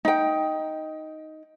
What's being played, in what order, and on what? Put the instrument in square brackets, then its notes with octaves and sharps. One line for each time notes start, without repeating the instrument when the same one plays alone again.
[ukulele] D#4 G5